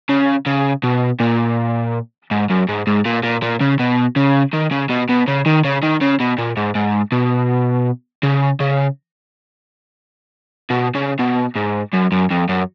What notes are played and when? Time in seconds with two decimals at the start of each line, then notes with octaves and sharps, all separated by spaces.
0.09 C#3
0.46 C#3
0.84 B2
1.20 A#2
2.31 G#2
2.50 F#2
2.69 G#2
2.87 G#2
3.06 A#2
3.23 A#2
3.42 A#2
3.61 C#3
3.79 B2
4.16 C#3
4.53 D#3
4.72 C#3
4.90 B2
5.09 B2
5.28 C#3
5.46 D#3
5.64 C#3
5.83 D#3
6.01 C#3
6.20 B2
6.38 A#2
6.57 G#2
6.75 G#2
7.12 B2
8.23 C#3
8.60 C#3
10.70 B2
10.95 C#3
11.19 B2
11.56 G#2
11.94 F#2
12.12 F#2
12.30 F2
12.49 F#2